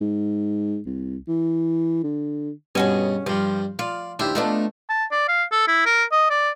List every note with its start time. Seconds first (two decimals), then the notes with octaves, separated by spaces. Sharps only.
0.01 G#2
0.86 C2
1.28 E3
2.04 D3
2.75 G2 B2 C#4 F#4 G#4
3.26 G2 F3 G3
3.79 F4 D5
4.19 D#2 D4 E4 G4 C5
4.35 A3 B3 D4 D#4 F4
4.90 A5
5.12 D5
5.29 F5
5.52 A4
5.68 E4
5.86 A#4
6.12 D#5
6.30 D5